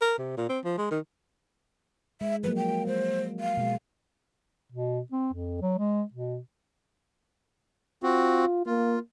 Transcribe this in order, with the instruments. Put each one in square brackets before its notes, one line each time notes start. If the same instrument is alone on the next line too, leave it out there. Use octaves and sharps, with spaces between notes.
[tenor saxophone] A#4
C3
A#2
C4
F3
G#3
D#3
[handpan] G#3 [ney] E5
[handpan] F3 F#3 A#3 [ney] B4
[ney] G5
[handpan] G#3 [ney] C5
[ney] F5
[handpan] B2 G#3
[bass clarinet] B2
C4
F2
F#3
G#3
B2
[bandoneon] C4 F#4 [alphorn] F4
[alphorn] A#3 [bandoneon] F4